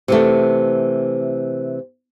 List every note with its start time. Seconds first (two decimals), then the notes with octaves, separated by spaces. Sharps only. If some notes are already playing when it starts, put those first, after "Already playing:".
0.08 C3 E3 A3